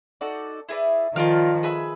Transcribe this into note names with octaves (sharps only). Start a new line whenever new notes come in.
D#4 F#4 A4 D5
E4 G#4 B4 D5
D#3 F3 F4 A#4 D5 F5
G#4 B4 E5 G#5